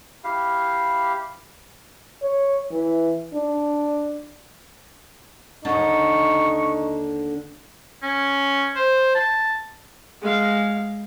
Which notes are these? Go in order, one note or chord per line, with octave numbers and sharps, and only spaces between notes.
E4 G4 F5
C#5
E3
D4
D#2 D3 D#4 C#6
C#4
C5
A5
G#3 F5